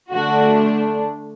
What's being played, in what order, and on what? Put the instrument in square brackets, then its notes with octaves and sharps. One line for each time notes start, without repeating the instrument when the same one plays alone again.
[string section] D3 A3 D4 F#4